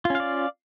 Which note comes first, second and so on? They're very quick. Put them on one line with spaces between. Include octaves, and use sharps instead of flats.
F4 C#4 F5 D5